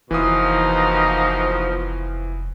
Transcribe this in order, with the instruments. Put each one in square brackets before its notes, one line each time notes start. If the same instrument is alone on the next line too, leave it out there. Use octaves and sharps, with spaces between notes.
[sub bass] F1 [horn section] B2 F3 [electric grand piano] E3 D#6 [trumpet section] A#3 D#4